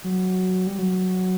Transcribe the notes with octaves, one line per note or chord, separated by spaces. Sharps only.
F#3
G3
F#3